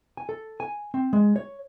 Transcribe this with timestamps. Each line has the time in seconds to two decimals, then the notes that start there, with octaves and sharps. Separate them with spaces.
0.17 G#5
0.29 A4
0.60 G#5
0.94 C4
1.13 G#3
1.36 C#5